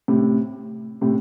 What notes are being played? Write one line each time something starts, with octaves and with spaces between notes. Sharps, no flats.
A2 C3
A2 C3